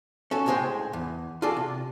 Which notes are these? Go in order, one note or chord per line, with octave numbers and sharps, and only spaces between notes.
C#4 F#4 A4
D2 A2 G#3 G#4 C5 G5
E2
F4 F#4 G#4 A4 D5
C3